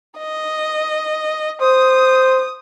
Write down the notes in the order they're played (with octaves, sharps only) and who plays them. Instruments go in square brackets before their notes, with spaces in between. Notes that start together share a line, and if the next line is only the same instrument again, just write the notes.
[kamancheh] D#5
[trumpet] C5 [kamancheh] D#6